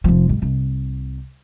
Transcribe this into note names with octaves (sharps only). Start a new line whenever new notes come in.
F1 F3
G#2 F#3
C2